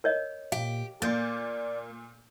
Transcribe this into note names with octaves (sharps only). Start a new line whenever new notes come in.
A#4 C#5 D#5
A#2 G4 F5
A#2 A#3 D5 G6 A6